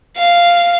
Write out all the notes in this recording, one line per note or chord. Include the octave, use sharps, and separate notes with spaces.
F5